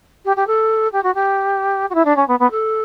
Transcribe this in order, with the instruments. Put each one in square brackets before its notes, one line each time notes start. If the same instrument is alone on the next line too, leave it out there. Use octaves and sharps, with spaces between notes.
[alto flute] G4
G4
A4
G4
F#4
G4
F#4
E4
D4
C#4
B3
B3
A4